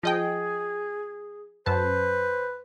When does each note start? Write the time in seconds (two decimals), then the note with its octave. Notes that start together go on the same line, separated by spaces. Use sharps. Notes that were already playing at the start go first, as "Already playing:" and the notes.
0.03 F3 G#4 D#5 G5
1.66 F#2 B4 C5 A5